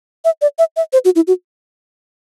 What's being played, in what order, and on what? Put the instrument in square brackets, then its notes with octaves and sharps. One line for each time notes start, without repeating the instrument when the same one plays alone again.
[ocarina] E5
D5
E5
E5
C5
F#4
E4
F#4